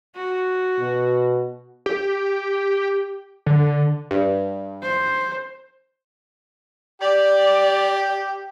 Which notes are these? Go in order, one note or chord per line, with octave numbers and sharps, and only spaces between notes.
F#4
B2
G4
D3
G2
C5
G4 D5